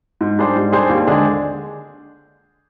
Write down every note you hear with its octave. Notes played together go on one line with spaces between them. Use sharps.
G#2
G3 D4 G#4 C5
G#2
G3 D4 G#4 C5
D#2
D3 G#3 D4 G#4